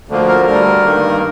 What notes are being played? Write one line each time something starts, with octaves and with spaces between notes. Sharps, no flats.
D2 D3 F3 A#3
A#4
D2 D3 G3 A#4
G2 D#3 A#3